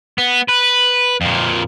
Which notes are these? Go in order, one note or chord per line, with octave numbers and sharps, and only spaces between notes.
B3
B4
F2 A#2